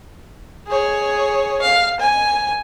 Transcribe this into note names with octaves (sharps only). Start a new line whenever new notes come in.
G#4 C#5
F5
G#5